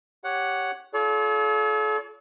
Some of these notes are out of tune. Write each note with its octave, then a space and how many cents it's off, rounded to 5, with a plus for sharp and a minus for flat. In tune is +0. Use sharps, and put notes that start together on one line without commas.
G4 +0 C#5 +0 F#5 +0
F4 +0 A4 -40 C#5 +45